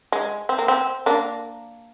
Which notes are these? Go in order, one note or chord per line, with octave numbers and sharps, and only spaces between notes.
G#3
C4
A#3
C4
A#3 D4